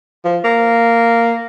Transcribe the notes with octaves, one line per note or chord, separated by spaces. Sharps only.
F3
A#3